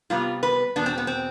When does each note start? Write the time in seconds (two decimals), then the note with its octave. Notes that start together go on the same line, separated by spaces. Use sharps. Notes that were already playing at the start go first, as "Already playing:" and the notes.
0.10 C3 G3 B3 F4
0.43 B4
0.76 E2 B2 B3 D4
0.86 C4
0.98 B3
1.07 C4